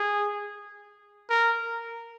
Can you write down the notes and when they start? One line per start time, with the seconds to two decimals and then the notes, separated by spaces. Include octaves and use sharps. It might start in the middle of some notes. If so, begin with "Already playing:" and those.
Already playing: G#4
1.30 A#4